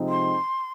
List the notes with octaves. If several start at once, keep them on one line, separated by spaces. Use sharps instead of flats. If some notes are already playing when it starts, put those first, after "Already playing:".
Already playing: C3 F3 G#3 C4 D#4
C6